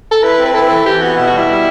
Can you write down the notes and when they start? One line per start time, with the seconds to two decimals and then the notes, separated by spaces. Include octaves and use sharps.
0.11 A4
0.23 E4 B4
0.38 C4
0.46 B4
0.54 E4 A4
0.62 B4
0.69 E3 A4
0.86 E3 G4
1.01 B3 F#4
1.16 B2 E4
1.27 F#4
1.33 G3 E4
1.47 G3